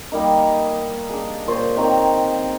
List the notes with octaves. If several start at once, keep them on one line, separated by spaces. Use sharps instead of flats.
G3 A#3 D#4
D4 G#4
A#2 C5 C#5
D#3 C4 A#5